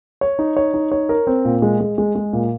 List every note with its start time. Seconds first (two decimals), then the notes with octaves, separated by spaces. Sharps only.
0.21 C#5
0.39 D#4
0.57 C#5
0.74 D#4
0.92 C#5
1.09 A#4
1.27 C4
1.45 A#2
1.62 G#3
1.80 G#3
1.98 G#3
2.15 G#3
2.33 A#2